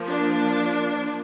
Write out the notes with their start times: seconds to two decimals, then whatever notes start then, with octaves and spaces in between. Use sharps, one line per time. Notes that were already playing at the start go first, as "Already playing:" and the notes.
Already playing: F3 A#3
0.09 D4